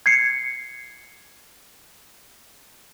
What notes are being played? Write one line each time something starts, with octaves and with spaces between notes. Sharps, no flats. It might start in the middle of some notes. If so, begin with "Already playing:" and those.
G#6 C7 C#7